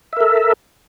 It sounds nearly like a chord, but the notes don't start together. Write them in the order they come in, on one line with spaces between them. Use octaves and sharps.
E5 A#4 A4